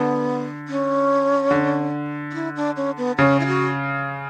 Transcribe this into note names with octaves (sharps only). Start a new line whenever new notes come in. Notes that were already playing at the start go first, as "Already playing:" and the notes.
Already playing: D3 B3
C#4
D3
D4
E4
D4
C#4
B3
C#3 C#4
E4
F#4